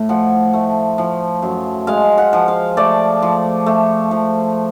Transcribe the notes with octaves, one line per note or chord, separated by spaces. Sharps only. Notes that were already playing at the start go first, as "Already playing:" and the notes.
Already playing: A2
F3 F#5
A3
F3
F#2
G#3 F5
F#5
F3
F5
A3 D5
F3
A3
F3